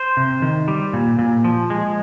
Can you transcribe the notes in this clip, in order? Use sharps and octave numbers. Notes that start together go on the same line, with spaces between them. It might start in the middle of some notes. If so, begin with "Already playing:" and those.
Already playing: C5
C3
D#3
G3
A#2
A#2
F3
G#3